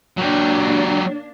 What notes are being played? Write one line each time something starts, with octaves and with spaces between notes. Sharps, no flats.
F#3 A#3 D4 G4